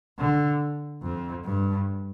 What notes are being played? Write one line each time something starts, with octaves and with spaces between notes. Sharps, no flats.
D3
F2
G2